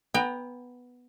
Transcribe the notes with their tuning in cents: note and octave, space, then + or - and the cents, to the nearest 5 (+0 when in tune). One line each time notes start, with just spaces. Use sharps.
B3 +0 G5 +25 A#5 +0